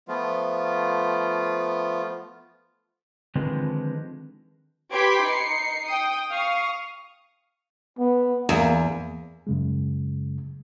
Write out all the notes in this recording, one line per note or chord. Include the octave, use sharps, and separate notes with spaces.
F3 A3 B3 F4
D3 D#3 F3 G#3 C4 B4
G4 B4 C6 D6 G#6 B6
D#4 C7 C#7
G5 D#6
F5 C#6 D#6
B3
E2 A#3
F#2 C#3 G#3